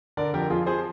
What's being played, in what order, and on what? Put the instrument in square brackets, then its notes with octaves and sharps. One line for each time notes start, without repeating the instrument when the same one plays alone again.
[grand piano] D3 A#4 D5
F2 G4 A#4
F2 F4 G#4
F3 G#4 C5